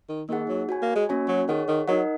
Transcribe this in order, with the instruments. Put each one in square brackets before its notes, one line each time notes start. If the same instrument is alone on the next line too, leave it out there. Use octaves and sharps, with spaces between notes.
[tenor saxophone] D#3
[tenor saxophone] D#3 [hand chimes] A#3 D#4 G#4 F#5
[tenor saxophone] F#3
[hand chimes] F#4 C#5 G#5
[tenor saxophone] A#3
G#3
[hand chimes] A#3 C#4 F#4 C#5 G#5
[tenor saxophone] F#3
[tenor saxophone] D#3 [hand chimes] G#4 C#5 F#5
[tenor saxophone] D#3
[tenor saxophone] F#3 [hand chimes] D#4 A#4 D#5 F#5